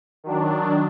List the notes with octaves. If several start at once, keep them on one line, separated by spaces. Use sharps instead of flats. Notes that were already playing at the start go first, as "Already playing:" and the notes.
D#3 F#3 D4